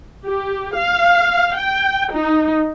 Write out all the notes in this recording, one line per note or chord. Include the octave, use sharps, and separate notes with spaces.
G4
F5
G5
D#4